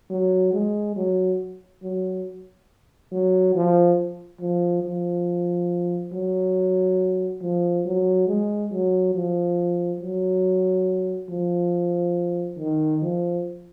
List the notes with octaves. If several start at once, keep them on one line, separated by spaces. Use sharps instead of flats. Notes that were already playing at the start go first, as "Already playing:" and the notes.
F#3
G#3
F#3
F#3
F#3
F3
F3
F3
F#3
F3
F#3
G#3
F#3
F3
F#3
F3
D#3
F3